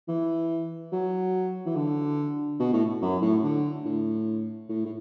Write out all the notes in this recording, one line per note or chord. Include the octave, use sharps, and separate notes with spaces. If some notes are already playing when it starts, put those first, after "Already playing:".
E3
F#3
E3
D3
B2
A2
F#2
A2
D3
A2
A2
A2